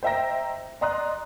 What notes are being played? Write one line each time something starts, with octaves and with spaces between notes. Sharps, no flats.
C5 D#5 E5 G5 A#5 A#6
D5 D#5 A#5 C6 D#6 F#6